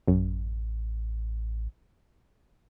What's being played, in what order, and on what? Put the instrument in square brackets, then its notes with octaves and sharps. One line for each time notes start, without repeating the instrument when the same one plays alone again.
[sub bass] A1 [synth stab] F#2